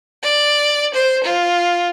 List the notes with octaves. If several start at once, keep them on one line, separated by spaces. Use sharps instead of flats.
D5
C5
F4